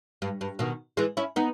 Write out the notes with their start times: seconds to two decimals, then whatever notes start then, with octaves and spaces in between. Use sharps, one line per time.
0.22 G2
0.41 G2
0.59 B2 D#3
0.97 E3 G#3
1.17 C#4 E4
1.36 B3 D#4